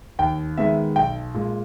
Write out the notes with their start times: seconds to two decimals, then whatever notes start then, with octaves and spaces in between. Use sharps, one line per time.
0.19 D#2 G5
0.57 D#3 G#3 B3 E5
0.96 B1 G5
1.34 A#2 G#3